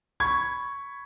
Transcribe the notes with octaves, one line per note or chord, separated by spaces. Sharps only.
B5 C#6 G#6